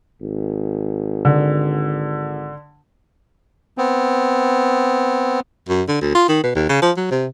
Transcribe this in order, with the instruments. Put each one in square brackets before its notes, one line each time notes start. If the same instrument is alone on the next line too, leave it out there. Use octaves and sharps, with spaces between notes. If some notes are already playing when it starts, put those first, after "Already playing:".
[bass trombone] G#1
[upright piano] D3
[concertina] B3 C4
[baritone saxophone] F#2
D3
D2
F4
D#3
B2
D#2
C#3
F3
F#3
C3